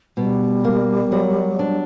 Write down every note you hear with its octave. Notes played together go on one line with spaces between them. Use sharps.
B2 G3
A#3
F#3
D4